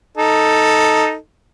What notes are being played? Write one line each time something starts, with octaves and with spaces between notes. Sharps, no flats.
D#4 A4